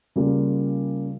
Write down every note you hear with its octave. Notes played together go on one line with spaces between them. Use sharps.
C#3 G3 A#3 F4